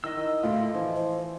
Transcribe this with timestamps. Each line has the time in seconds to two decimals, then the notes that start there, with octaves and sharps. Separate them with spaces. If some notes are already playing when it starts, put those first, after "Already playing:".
0.04 D#3 E4 D#5 E6
0.17 D#3 E4
0.43 D2 A2 A3 F4
0.74 E3 F3
0.95 C5